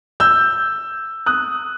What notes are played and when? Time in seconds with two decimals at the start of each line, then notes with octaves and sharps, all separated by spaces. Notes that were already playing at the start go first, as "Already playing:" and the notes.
0.20 E6 G6
1.26 D#6 F#6